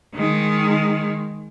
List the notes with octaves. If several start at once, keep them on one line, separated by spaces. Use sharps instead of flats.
D#3 G#3